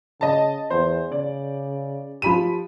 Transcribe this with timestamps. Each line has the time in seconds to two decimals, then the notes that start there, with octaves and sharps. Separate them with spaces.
0.21 C#3 D#5 A5
0.70 E2 C5
1.12 C#3 D5
2.22 F3 G4 B5 D#7